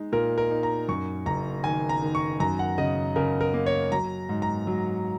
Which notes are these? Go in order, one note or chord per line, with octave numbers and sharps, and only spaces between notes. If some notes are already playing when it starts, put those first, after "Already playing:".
Already playing: G#3 D#4
A#2 A#4
A#4
D#4
A#5
F#2 C#6
F#1 A#5
D#3 G#5
A#5
D#3
C#6
F#2 A#5
F#5
C#3 D#5
C#3 A#4
A#4
A#3
C#5
F#3 A#5
G#2
A#5
F#3